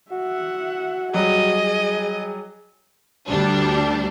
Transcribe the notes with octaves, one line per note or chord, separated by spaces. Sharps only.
F#4 E5 F#5
F#3 G3 G#4 D#5
D2 G3 D4